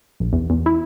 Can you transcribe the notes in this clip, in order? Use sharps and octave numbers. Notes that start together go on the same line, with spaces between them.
A#1
E2
E2
E4